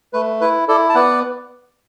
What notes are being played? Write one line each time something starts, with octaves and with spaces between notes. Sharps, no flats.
A3 B4
E4 B4
E4 A4 D5
A5
B3 D5 F#5